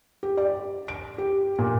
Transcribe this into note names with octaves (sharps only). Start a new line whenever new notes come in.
G4
D5
D7
G4
A#2